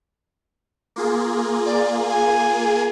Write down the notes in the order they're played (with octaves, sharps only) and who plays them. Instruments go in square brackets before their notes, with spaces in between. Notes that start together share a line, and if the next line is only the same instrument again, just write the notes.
[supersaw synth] A#3 F4 G#4
[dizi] D5
G#5